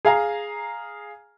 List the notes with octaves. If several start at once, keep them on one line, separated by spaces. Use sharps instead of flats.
G#4 F5 G#5 A#5